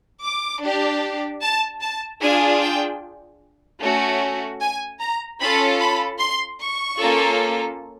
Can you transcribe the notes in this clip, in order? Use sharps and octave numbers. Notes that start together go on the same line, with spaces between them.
D6
D4 G4
A5
A5
D4 F4 G#4 G#5
G5
A3 C#4 F#4
G#5
A#5
C#4 F4 A4 B5
B5
C6
C#6
A#3 C#4 F4 A4